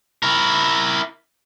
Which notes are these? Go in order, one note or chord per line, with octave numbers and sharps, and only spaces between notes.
E4 A#4